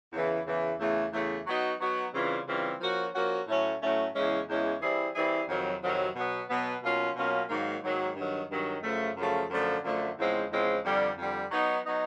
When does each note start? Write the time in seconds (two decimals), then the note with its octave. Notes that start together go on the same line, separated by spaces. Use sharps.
0.13 E2 C#3 E3
0.46 E2 C#3 E3
0.79 E2 C#3 E3 A3
1.13 E2 C#3 E3 A3
1.46 F#3 B3 D#4 F#4
1.80 F#3 B3 D#4 F#4
2.14 C#3 E3 G3 C4 F4
2.47 C#3 E3 G3 C4 F4
2.81 F3 A#3 C#4 F#4
3.14 F3 A#3 C#4 F#4
3.47 A2 F#3 A3 C#4
3.82 A2 F#3 A3 C#4
4.15 E2 C#3 E3 G#3 C#4
4.49 E2 C#3 E3 G#3 C#4
4.81 E3 G3 C4 E4 G#4
5.15 E3 G3 C4 E4 G#4
5.48 F2 C3 D#3 F#3
5.82 F2 C3 D#3 F#3
6.16 B2 F#3 B3
6.49 B2 F#3 B3
6.83 B2 F#3 A#3 C#4 F4
7.16 B2 F#3 A#3 C#4 F4
7.49 G#2 D#3 F#3 A#3
7.84 G#2 D#3 F#3 A#3
8.16 G2 D#3 F#3
8.50 G2 D#3 F#3
8.83 F#2 C#3 F3 A3
9.16 F#2 C#3 F3 A3
9.50 F#2 D3 F3 A3
9.84 F#2 D3 F3 A3
10.18 E2 C#3 F3 G#3 C4
10.50 E2 C#3 F3 G#3 C4
10.85 F2 D3 G3
11.18 F2 D3 G3
11.51 F#3 B3 D#4
11.85 F#3 B3 D#4